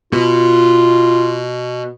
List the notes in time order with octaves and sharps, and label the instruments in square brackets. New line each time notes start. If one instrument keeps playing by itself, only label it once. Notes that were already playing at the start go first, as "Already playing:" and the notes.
[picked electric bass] B2 [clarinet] F4